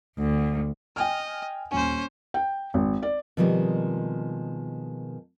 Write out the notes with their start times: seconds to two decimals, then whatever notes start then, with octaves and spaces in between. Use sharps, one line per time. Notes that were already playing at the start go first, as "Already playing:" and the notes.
0.18 D2
0.96 D#5 G5 G#5 F6
1.72 D#1 C#4 C5 G#5
2.34 G5
2.74 G#1
3.03 D5
3.37 B2 D#3 F3 G3 G#3 C4